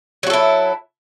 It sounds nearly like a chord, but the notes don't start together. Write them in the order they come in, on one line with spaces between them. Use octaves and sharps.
F#3 F#4 A4 E4